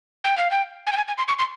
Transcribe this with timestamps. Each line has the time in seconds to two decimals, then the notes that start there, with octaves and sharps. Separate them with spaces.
0.24 G5
0.38 F5
0.51 G5
0.87 G#5
0.92 G5
0.97 G#5
1.08 G#5
1.18 C6
1.28 C#6
1.39 C6